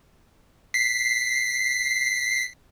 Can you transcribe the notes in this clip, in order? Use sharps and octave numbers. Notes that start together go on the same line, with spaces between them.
B6 C7